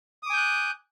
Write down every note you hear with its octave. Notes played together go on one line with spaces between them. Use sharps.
G#5 D6 D#6 F#6 G6